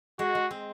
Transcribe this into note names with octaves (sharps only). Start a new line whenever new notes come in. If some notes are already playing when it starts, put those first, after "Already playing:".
G#3 F#4
G#3
C4